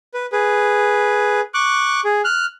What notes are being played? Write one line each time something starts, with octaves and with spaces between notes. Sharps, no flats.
B4
G#4 B4
C#6 D6 F#6
G#4
F6 F#6